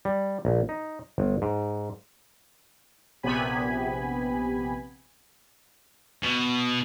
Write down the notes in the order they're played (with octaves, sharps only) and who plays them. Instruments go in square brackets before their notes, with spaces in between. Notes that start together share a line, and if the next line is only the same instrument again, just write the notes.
[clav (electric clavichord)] G3
A#1
D#4
G1
G#2
[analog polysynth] A#1 C3 B3 G4 G#5 B5
[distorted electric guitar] B2